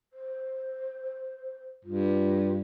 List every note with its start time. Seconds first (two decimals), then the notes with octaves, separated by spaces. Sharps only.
0.13 C5
1.85 G2 F4